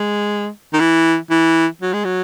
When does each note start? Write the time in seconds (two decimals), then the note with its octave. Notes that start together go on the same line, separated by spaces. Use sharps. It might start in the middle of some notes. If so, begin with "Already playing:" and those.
Already playing: G#3
0.73 D#3
0.80 E3
1.30 E3
1.82 F#3
1.93 G#3
2.04 F#3